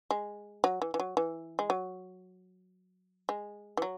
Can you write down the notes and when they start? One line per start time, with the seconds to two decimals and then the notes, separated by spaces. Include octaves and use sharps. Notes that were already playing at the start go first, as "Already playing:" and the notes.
0.11 G#3
0.64 F#3
0.82 E3
0.94 E3
1.00 F#3
1.17 E3
1.59 G#3
1.70 F#3
3.29 G#3
3.77 E3
3.82 F#3